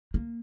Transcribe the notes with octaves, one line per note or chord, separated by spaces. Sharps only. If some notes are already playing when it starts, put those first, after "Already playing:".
A#3